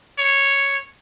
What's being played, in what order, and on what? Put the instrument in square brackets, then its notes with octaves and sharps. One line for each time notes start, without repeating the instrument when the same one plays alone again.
[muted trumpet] C#5